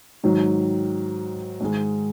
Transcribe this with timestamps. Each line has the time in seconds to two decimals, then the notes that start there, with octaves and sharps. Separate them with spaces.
0.24 G#2 D#3 F#3
1.61 G#2 D#3 G#3